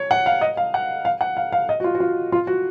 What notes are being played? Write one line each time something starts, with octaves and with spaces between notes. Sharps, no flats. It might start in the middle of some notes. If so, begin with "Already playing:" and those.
Already playing: C#5
F#5
F5
D#5
F5
F#5
F5
F#5
F5
F5
D#5
F#4
F4
F#4
F4
F4
F#4